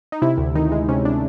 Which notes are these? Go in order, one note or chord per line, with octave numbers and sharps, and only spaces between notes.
D#4
C3 E4
D2
D#3 D#4
G#3
C3 C#4
D4